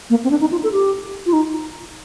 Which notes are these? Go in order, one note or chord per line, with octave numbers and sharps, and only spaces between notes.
A#3
C4
D4
D#4
F4
A4
G4
F4
D#4